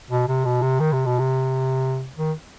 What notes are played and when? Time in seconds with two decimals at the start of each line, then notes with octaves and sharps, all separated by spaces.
0.11 B2
0.28 C3
0.45 B2
0.62 C3
0.80 D#3
0.93 C3
1.06 B2
1.19 C3
2.17 D#3